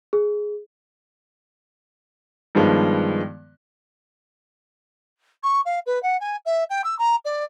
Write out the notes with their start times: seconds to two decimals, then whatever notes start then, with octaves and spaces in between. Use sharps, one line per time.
0.13 G#4
2.55 G2 D#3 F3 G#3 B3
5.43 C#6
5.65 F5
5.86 B4
6.03 F#5
6.20 G#5
6.45 E5
6.70 G5
6.84 E6
6.99 A#5
7.25 D5